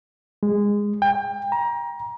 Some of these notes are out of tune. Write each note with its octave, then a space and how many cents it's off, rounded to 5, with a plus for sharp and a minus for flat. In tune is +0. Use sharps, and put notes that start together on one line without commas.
G#3 -15
G5 +30
A#5 +25